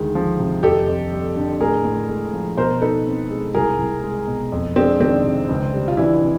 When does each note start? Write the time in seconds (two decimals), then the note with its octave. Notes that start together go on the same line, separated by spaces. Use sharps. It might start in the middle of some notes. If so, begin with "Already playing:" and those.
Already playing: D2 D#3 G#3
0.15 F3
0.39 C3
0.63 F2 G4 A4
0.88 F2
1.12 G3
1.36 D3
1.60 A2 G#4 A#4
1.85 A2
2.08 G#3
2.33 F3
2.57 B2 A#4 C5
2.82 D#4 A4 B4
3.06 C4
3.30 G#3
3.54 C2 G#4 A#4
3.79 C2
4.03 G#3
4.27 B2
4.52 F2
4.76 G#3 C4 D4
5.00 D#3 C4 D4
5.24 C3
5.49 C#2
5.74 G3
5.88 F4
5.97 E3 D4 E4
6.21 C3